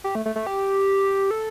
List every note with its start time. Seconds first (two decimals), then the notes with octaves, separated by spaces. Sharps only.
0.04 G4
0.15 A3
0.26 A3
0.36 A3
0.47 G4
1.31 A4